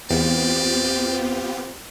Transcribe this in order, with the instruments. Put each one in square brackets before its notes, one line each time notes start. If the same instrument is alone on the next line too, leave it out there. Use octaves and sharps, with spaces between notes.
[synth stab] E2 [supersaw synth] B3 F4 G4 [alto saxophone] C4 [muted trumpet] D5